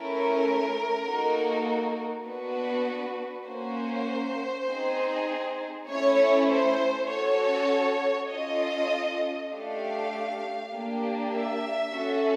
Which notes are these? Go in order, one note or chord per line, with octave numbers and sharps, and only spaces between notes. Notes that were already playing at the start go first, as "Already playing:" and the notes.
Already playing: A3 C#4 E4 A#4
A#3 D#4 F#4 A4
B3 D4 F#4 B4
A#3 C#4 F#4 C5
C4 D#4 G#4
A3 C#4 E4 C#5
C5
C#4 F#4 A4 C#5
C#4 F4 A4 D#5
A3 D4 G4 F5
A#3 D4 G4
E5
C#4 F#4 A4